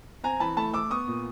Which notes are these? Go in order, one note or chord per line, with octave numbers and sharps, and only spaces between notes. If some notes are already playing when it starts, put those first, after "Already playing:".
C4 G#5 A#5
E3 A5 B5
A3 A5 B5
A3 D6 E6
B3 C#6 D#6
A#2